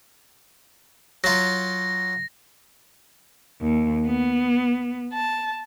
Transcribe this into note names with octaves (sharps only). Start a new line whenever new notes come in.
F#3 F4 A#6
D#2
B3
A5